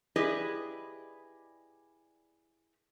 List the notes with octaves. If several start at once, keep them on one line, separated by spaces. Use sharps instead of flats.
E4 G4 G#4 B4 D5 D#5